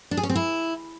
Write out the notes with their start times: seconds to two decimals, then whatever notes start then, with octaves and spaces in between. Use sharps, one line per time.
0.11 D4
0.17 G#4
0.23 C#4
0.29 C4
0.36 E4